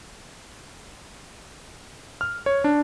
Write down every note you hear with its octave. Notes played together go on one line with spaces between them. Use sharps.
F6
C#5
D4